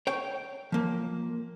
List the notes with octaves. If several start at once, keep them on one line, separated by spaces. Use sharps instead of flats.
C#5 G5
F3 A#3